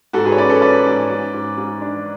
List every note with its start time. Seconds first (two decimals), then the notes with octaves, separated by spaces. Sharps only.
0.13 G#2 F#4 A4
0.25 G#4 B4
0.32 C#5
0.38 C#4 B4 D5
0.49 A4 C#5
0.62 C#4 B4 D5
0.86 G#2
1.10 G#2
1.34 G#2
1.58 G#2
1.82 D4